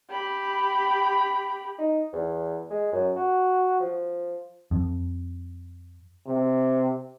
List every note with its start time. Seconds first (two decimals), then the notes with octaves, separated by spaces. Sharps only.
0.11 G4 B5
1.79 D#4
2.13 E2
2.71 G#3
2.93 F#2
3.16 F#4
3.80 F3
4.71 F2
6.27 C3